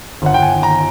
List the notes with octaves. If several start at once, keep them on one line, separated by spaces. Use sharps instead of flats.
G1 F#5
G1 G5
G#5
D#3
A#5